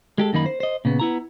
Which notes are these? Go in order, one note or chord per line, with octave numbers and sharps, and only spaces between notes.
G#3 G4 A4
F#2 D#3 A#3 D#4 B5
C5
C5 D#5
A#2 C#3 B3
B3 E4 A#5